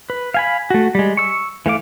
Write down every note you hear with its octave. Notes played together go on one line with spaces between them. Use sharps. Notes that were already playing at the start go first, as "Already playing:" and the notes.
B4
F5 G#5 B5
A3 F#4
G3 G#3
C#6 E6
E3 A3 F5 D6